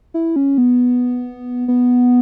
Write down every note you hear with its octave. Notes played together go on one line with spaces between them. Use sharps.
E4
C#4
B3
B3